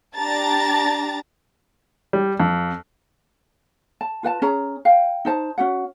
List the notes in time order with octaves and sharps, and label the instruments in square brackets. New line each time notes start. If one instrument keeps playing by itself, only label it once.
[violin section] D4 G4 A5 A#5 A6
[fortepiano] G3
F2
[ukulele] A5
F4 B4 F#5 A5
C#4 G#4 A#5
F5 G5
D#4 C5 A5
C#4 F#4 F#5